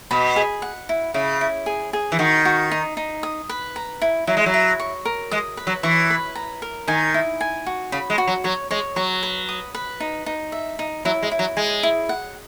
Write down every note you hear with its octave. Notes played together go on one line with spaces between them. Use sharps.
B2 B5
G#4
F#5
E4
C#3 E4
E4
G#4
G#4
E3
D#3 F#4
F#4
D#4
D#4
D#6
B4
A#5
E4
F#3 E4
G#3
F#3
E4
C#6
A#4
G#3 D#6
B4
F#3
E3 C#6
B4
A#5
A#4
D#3 G#5
E4
G#5
F#4
C#3 B5
G#3
F#4
F#3
F#3 C#5
G#3 C#5
F#3 C#6
B4
D#6
B4
D#4
D#4
E5
D#4
F#3 E4
G#3
E4
F#3
G#3 G#5
E4
F#5